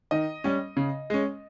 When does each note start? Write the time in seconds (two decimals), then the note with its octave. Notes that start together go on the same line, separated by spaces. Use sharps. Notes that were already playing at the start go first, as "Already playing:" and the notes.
0.11 D#3 D#5
0.44 G3 C#4
0.77 C#3
1.10 G#3 C#4